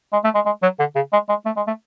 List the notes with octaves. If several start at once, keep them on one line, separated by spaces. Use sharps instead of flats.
G#3
A3
G#3
G#3
F#3
D3
C#3
G#3
G#3
A3
G#3
A3